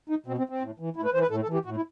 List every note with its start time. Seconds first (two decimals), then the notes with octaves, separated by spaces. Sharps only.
0.09 D#4
0.26 B2 C4
0.38 C4
0.49 C4
0.61 A2
0.79 E3
0.96 A2 E4
1.05 B4
1.13 E3 C5
1.22 B4
1.31 A2 A4
1.43 A4
1.48 E3
1.54 G4
1.65 A2 F#4
1.76 E4